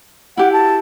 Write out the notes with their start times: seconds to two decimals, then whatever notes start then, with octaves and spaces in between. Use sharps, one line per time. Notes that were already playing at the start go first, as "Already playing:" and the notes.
0.37 E4 G4 F#5
0.53 A5